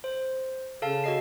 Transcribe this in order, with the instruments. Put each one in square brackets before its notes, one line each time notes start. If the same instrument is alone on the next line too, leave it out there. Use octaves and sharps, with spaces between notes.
[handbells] C5
[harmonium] C#3 [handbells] A4 F5 A5
[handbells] F#4 D#5 C7